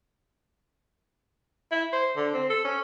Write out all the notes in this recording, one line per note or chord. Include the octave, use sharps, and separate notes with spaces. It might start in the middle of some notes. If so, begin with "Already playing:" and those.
E4
C5
D3
C4
A4
C#4